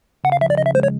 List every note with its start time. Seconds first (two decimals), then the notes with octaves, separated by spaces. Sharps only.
0.24 C#3 F#5
0.32 F5
0.41 F3 E5
0.50 D5
0.57 C#3 D#5
0.66 E5
0.75 G#3 C5
0.83 C#5